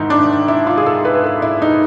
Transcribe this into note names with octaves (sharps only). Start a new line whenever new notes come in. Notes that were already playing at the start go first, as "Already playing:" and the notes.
Already playing: G#2 D#3 D#4 E4
D4
E4
F4
G#4
A4
B4
A4
E4
D#4